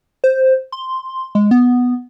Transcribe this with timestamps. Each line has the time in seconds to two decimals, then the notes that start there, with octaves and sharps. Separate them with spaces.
0.24 C5
0.72 C6
1.35 G#3
1.51 B3